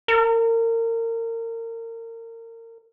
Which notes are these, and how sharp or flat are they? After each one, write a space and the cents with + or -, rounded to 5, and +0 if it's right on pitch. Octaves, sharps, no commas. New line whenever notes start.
A#4 -30